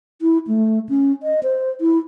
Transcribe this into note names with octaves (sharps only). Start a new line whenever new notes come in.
E4
A3
C#4
D#5
C5
E4